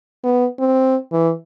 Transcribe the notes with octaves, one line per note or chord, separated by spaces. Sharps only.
B3
C4
E3